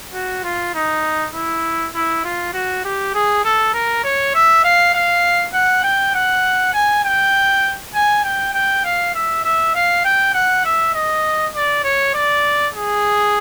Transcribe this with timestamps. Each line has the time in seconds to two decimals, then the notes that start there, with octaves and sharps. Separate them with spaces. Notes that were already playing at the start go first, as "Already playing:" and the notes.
0.14 F#4
0.44 F4
0.74 D#4
1.34 E4
1.94 E4
2.24 F4
2.53 F#4
2.84 G4
3.14 G#4
3.44 A4
3.74 A#4
4.04 C#5
4.34 E5
4.64 F5
4.94 F5
5.53 F#5
5.83 G5
6.15 F#5
6.73 G#5
7.04 G5
7.94 G#5
8.24 G5
8.54 G5
8.85 F5
9.14 E5
9.44 E5
9.75 F5
10.05 G5
10.34 F#5
10.65 E5
10.94 D#5
11.55 D5
11.84 C#5
12.14 D5
12.74 G#4